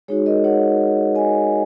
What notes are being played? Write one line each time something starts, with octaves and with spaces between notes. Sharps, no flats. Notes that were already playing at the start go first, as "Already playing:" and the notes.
G#3 D#4 F#4 G#4 C#5
A#4 D#5
C#5 F#5
D#5 G#5